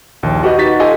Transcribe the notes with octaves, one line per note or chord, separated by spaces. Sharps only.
A#1 D#2
F#4 G4 B4 D#5
D#4 F#4 A6 B6
F4 G4 A4 D#5 G#5